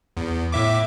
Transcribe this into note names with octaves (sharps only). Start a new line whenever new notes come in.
E2
A2 E5 D6